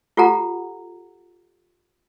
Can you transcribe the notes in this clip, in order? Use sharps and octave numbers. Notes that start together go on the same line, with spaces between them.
F4 G4 A4 F#5 A#5